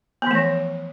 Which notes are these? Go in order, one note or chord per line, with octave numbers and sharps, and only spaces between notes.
E3 F3 A3 B3